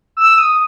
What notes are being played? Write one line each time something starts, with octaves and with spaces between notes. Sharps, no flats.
E6
D#6